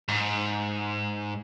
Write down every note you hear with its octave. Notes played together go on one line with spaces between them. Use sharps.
G#2